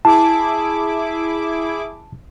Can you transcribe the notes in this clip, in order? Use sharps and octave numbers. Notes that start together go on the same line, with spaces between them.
E4 G#4 A5 D6